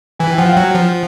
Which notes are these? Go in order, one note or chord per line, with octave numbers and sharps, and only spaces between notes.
E3 G#5
G5
F3 F#5
F5 G5
F#3
F3